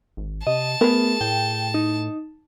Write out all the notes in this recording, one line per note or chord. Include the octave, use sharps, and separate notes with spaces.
G#1
C3 D#5 A5
A3 B3 G#4 A#4
A2 G5
D#4